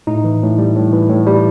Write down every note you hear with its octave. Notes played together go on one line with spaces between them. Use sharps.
A2 D#4
E3
A2
G3
A2
E3
A2
G3